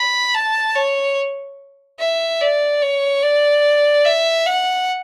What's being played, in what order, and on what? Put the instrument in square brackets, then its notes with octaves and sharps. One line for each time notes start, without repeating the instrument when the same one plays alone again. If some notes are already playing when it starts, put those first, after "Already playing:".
Already playing: [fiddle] B5
A5
C#5
E5
D5
C#5
D5
E5
F#5